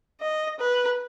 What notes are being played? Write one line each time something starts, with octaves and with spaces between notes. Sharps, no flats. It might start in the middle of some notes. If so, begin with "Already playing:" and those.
D#5
B4